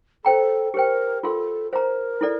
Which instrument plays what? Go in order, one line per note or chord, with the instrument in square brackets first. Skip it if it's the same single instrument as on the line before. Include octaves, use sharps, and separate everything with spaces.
[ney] A4 [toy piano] C5 G5 A#5
[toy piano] G4 C5 G5 [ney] A#4
[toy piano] F4 A#4 F5 C6 [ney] A4
[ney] A#4 [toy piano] C5 F5 A#5
[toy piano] E4 A4 D5